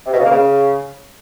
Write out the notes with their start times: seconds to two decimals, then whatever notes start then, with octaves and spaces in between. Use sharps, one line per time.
0.06 C3
0.12 B2
0.19 C#3
0.25 A#3
0.31 C#3